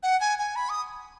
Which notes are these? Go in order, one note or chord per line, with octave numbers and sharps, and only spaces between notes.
F#5
G#5
G#5
B5
D#6